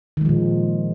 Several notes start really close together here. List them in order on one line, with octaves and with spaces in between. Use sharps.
D#3 G#3 F3 A#2